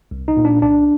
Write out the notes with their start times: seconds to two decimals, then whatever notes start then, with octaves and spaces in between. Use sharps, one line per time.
0.11 C2
0.28 D#4
0.37 A#2
0.45 D4
0.62 C2 D4